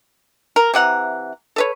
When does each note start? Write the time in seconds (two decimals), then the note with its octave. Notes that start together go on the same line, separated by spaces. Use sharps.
0.56 A#4
0.74 C3 E3 F#5 A#5
1.56 A4 B4 C#5